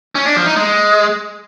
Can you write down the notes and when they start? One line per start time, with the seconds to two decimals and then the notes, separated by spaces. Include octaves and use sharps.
0.15 C#4
0.26 D4
0.36 F3
0.46 D#4
0.57 G#3